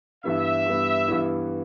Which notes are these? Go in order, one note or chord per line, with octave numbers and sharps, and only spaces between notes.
G2 E3 G3 B3 E4 E5
G2 E3 G3 B3 E4
G2 E3 G3 B3 E4